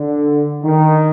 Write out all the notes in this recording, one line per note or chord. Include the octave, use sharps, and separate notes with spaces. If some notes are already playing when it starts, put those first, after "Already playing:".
Already playing: D3
D#3